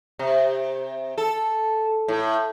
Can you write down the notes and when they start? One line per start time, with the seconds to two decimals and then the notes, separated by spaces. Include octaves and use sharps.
0.19 C3
1.18 A4
2.08 A2